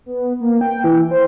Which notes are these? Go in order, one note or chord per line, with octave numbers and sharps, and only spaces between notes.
B3
A#3
G5
E3
C5